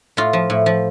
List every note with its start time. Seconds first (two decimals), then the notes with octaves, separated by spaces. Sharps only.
0.17 A2 F4
0.33 F3
0.50 A2
0.66 F3